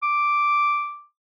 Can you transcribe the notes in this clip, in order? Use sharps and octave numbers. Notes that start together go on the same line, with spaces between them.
D6